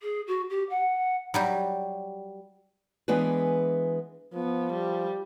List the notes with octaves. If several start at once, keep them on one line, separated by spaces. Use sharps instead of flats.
G#4
F#4
G4
F#5
F#3 G3 G4
E3 G#3 B3 D4 G#4 B4
F3 B3
G3